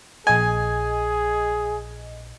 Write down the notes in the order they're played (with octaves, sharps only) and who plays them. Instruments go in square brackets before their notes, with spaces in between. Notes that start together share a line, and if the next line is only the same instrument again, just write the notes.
[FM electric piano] A#1 D#5 [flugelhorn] G#4 [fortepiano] G#5